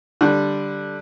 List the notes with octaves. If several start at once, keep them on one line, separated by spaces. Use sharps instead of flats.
D3 G3